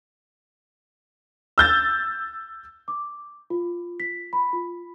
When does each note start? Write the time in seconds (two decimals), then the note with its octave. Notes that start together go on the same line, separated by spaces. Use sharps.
1.58 E6 G6 A6
2.88 D6
3.50 F4
4.00 B6
4.33 B5
4.53 F4